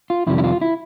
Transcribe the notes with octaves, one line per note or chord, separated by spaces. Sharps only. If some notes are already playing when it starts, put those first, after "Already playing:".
F4
F2 C3 D#3 G3 E4
E4
F4
E4